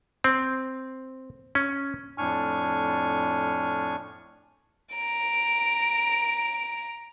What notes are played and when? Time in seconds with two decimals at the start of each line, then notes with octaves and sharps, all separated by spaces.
0.24 C4
1.55 C#4
2.18 F2 A2 D4 G#5 C#6 F6
4.95 A#5 D7